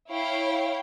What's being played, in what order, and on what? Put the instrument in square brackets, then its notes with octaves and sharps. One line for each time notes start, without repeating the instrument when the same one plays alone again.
[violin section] E4 C#5 F5 G5